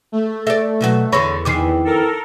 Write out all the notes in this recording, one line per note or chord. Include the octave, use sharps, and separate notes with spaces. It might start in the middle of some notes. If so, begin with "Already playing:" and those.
A3
A4 D5 E5
B2 F#3 F#4
E2 D3 A4 C#5 B5 C#6 A#6
F2 D#3 E3 D6 C7
A4 A#4